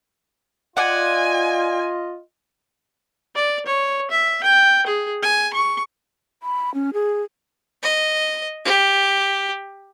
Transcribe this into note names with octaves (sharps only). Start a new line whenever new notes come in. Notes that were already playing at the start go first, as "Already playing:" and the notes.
F4 D5 D#5 F#5 G#5
D5
C#5
E5
G5
G#4
G#5
C#6
B5
C#4
G#4
D#5
G4